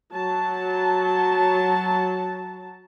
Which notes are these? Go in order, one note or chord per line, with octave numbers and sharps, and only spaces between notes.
F#3 A5